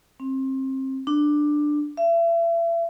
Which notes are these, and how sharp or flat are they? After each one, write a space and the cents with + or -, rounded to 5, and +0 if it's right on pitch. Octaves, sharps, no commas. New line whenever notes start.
C4 +30
D4 +10
E5 +35